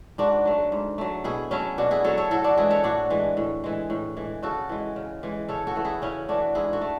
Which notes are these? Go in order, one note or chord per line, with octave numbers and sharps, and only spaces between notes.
G#2 D4 F#4
F#3 A3
G#2
F#3 A3
B2 E4 G#4
F#3 A3 C#4 E4
B2 D4 F#4
E4 G#4
F#3 A3 A4 C#5
A4 C#5
A2 F#4 A4
D4 F#4
E3 G#3 E4 G#4
A4 C#5
A2 D4 F#4
E3 G#3
A2
E3 G#3
A2
E3 G#3
C#3 F#4 A4
E3 G#3
C#3
E3 G#3
C#3 A4 C#5
F#4 A4
E3 A3
E4 G#4
C#3 C#4 E4
E3 A3 D4 F#4
G#2 E4 G#4
F#4 A4
A3